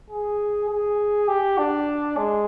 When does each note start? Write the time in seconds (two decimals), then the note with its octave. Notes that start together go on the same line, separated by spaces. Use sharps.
0.10 G#4
0.69 G#4
1.28 G4
1.58 D4
2.17 G#3